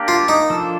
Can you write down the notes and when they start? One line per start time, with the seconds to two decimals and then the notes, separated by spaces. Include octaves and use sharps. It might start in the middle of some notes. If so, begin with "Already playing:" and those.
Already playing: A#3 D4 G4 A#4
0.08 F4
0.28 D#4
0.50 F3 A#3 D4 A4